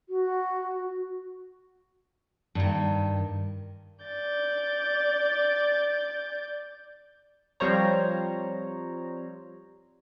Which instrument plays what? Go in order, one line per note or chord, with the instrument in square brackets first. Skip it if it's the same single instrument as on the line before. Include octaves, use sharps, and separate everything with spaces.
[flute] F#4
[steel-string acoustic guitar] G2 D#3
[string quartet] D5 G6 A6
[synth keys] F3 G3 C4 C5 C#5 A#5